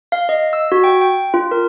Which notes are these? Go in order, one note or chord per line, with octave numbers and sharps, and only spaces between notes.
F5
D#5
E6
F#4
G5
G5
F4
A#4